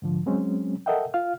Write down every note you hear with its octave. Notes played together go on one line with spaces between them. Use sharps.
G#2 D3 F3
F#3 G#3 C4 C#4
A4 A#4 D#5 E5 F#5 G5
F4 F5 F6